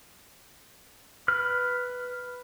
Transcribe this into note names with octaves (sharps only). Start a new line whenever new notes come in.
B4 F6